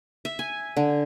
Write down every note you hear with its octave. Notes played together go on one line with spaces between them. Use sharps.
E5
G#5
D3